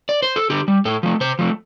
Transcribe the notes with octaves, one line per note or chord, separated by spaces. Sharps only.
D5
C5
A4
D3 G4
G3
A2 A4
F3 A3
C3 C5
F3 A3